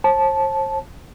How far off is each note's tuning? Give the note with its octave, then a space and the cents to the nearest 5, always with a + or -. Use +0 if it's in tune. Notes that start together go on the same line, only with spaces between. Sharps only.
C5 +45 A5 -15